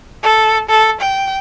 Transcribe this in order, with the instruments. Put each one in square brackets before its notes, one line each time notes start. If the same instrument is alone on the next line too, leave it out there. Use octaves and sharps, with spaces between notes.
[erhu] A4
A4
G5